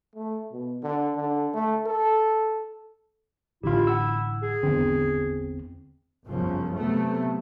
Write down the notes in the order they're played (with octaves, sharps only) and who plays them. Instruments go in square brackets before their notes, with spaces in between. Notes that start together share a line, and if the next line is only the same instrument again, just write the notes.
[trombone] A3
B2
D3
D3
A3
A4
[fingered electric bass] A1 D3 [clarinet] E4 [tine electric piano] F4 G4
[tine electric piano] F#5 E6
[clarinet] G#4
[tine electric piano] G#1 E2 C4 [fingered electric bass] D3
[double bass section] G1 C2 F#2 C#3 F3 C#4
C3 F#3 A3 B3